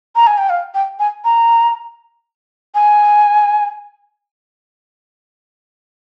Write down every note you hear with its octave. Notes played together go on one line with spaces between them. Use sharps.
A#5
G#5
G5
F5
G5
G#5
A#5
G#5